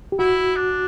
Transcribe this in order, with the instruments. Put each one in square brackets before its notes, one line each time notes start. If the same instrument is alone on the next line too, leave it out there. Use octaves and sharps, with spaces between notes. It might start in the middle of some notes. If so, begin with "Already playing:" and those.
[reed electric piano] G4
[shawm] E4 [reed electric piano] F#4
[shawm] D4